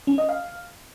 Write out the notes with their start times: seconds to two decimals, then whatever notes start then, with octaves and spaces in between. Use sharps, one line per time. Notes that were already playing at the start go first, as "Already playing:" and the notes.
0.07 C#4
0.18 D#5
0.29 F5